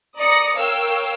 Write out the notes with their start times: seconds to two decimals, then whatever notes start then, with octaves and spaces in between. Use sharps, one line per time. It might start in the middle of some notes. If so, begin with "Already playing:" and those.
0.17 D5 A#5 D#6 A#6 C#7
0.56 A#4 C#5 F5 G5 E6